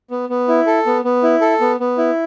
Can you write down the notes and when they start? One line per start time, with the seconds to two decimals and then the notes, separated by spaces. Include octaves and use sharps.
0.11 B3
0.29 B3
0.48 E4
0.67 A4
0.86 B3
1.04 B3
1.23 E4
1.41 A4
1.60 B3
1.80 B3
1.98 E4